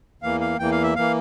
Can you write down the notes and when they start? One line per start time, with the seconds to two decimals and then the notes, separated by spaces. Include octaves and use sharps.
0.22 E2 E3 A#3 F5
0.41 F5
0.58 E2 E3 A#3 G5
0.72 F5
0.83 E5
0.96 E3 A#3 F5